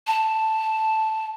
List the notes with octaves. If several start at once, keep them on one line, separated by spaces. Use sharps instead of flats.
A5